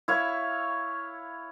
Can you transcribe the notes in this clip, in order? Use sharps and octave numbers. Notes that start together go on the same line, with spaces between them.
E4 C#5 F5